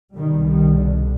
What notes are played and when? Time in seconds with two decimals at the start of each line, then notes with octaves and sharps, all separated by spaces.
0.14 C2 B2 D#3 G3
0.45 D#3 G3
0.75 D3